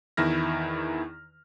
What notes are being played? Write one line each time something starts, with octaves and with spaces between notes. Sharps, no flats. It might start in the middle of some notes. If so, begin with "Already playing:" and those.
E2 D#3 E4 F6 A#6